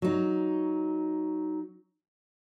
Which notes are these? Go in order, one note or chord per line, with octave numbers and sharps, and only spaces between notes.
F#3 D#4